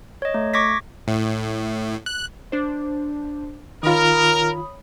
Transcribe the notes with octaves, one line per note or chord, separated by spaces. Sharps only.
C#5 D#5
A3
C#6 D6 G#6 A#6 B6
A2
F#6
D4 C5
D#3 F4 A#4 C#5 B5 D#6